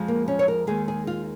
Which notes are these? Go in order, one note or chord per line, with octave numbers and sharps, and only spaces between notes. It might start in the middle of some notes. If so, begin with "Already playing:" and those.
Already playing: F2 F3 G#3
A#3
C#4
C#5
A#4
D#2 D#3 G#3 G#4
G#4
F4